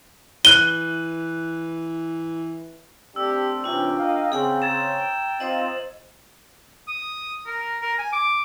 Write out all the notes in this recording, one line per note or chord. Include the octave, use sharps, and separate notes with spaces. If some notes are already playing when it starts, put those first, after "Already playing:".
E3 F#6 D#7 G7
A3 C4 D4 G4 E6
C3 E3 C#4 D4 F4 G5
A#4 D#5 F5
C#3 C4 G#4 F#5 G#5
A#5 G#6 A6 E7
C4 D#4 F4 C5 D#5 F#7
D#6
A#4
A#4
G#5
D6